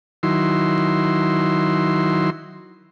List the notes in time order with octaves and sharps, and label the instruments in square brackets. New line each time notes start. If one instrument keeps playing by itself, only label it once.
[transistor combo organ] D#3 F#3 E4 C6